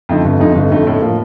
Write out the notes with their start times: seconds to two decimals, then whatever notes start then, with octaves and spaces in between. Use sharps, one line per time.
0.09 F2 D3 A3 D#4
0.25 G1
0.40 F2 D3 A3 D#4
0.56 G1
0.70 F2 D3 A3 D#4
0.87 A2
1.01 F3 A#3